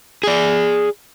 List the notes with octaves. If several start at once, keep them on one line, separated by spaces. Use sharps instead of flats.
G#4 D5